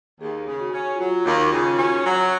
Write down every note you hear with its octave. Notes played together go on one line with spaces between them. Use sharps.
D#2 G#4
C#3
F#4
C#4
F4
F#3 F#4
D#2
D#4
F4
C#3
C#4 F#4
F#3